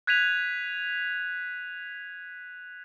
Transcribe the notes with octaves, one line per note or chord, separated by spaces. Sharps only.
F#6 G#6 B6 D#7 F7